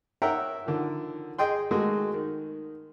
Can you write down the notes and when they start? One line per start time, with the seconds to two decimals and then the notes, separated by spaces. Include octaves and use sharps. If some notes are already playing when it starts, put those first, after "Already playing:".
0.22 A#4 C#5 E5 F#5 G5 A#5
0.66 D3 D#3 F3
1.38 G#4 D#5 G5 C6
1.71 D#3 G#3 A3 D#4 F#4 G#4
2.13 D#3